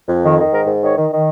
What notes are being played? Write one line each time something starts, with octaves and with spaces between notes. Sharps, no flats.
F2
D#3
D#3
G#2 A#4
G#2
D#3 C#5
D#3
D#3